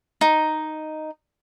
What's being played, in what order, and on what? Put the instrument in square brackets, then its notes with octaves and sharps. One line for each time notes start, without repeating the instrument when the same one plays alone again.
[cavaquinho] D#4